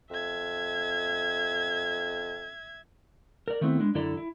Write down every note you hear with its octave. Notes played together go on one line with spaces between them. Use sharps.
F2 E5 G#6
A#4 D5
D#3 A3 B3 C4 E4
G3 G#3 D4
F#2 D3 E4 A4 D5 A#5
E4